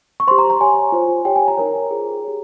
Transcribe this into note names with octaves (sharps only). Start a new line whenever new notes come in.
C#6
G4 C5 C6
A#5
A#5
G4 C#5 G#5
F4 C5
G4 C#5 G5
G#5
A#5
D#4 A#4 C#5
F4 G#4 C5
G4 C#5